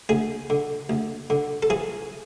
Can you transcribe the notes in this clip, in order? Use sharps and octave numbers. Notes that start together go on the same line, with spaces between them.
D2 G#4
D3
D2
D3
A4
E3 G#4